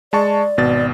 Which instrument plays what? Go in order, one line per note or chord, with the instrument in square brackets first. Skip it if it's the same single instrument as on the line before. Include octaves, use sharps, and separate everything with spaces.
[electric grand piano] G#3 A5 C#6 [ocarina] D5
[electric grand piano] G#1 B2 A6